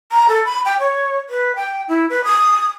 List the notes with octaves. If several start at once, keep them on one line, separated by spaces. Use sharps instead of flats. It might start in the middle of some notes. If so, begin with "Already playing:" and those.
A#5
A4
B5
G5
C#5
B4
G5
E4
B4
D#6